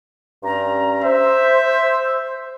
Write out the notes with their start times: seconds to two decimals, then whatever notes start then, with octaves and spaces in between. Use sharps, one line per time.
0.43 G2 C#4 A#5
1.04 C5 E5